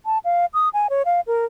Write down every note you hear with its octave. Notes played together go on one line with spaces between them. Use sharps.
A5
F5
D#6
G#5
C#5
F5
A#4